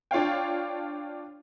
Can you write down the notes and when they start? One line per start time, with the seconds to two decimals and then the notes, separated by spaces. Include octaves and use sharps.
0.11 D4 F4 C#5 F5 G5